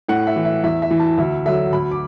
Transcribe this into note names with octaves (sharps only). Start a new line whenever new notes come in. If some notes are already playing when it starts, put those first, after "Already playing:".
A2 F#5
E5
E3
E5
E2 E5
E5
E3
A5
D2 E5
D3 F#3 E5
D2 B5
D6